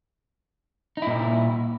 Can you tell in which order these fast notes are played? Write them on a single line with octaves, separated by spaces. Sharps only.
D#4 E4 A#2